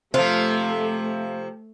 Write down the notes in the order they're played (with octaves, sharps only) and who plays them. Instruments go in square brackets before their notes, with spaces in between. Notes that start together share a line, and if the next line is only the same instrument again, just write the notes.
[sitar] C3 F3 [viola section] A3 [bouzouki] F4 [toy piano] C5